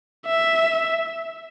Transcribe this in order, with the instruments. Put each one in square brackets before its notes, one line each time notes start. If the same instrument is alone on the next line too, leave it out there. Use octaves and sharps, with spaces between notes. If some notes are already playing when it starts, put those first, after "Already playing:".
[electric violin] E5